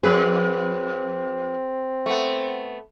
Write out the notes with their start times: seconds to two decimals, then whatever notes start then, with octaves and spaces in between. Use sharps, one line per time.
0.03 F2 C4 G#4 B4
2.06 A3 B3